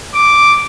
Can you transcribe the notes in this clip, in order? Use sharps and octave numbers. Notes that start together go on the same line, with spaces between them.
D6